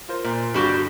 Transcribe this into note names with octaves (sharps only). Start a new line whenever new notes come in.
F4 A#4 C5
A#2
G2 D3 G3 F#4 G4